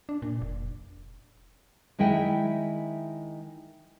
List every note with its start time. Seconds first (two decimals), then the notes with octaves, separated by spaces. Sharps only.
0.09 D4
0.22 A#2
0.41 F1
1.99 D#3 G#3 E4 E5 G5